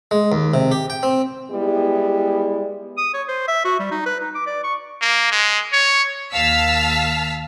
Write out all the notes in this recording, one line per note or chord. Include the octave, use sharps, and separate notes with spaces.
G#3
D#2
C3
G4
G5
C4
G3 G#3 B3 E4 G4
D#6
C#5
C5
E5
F#4
G3
D#4
B4
D#4
D6
D5
C#6
A#3
G#3
C#5
D#2 F5 A5 E6 F6 B6